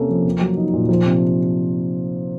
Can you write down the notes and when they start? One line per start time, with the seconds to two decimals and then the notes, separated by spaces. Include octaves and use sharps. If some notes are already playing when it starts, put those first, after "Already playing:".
Already playing: C3 A#3 C#4 A4
0.09 F3
0.25 A#3
0.41 F#3
0.57 D#4
0.74 A#2
0.89 F3
1.05 C3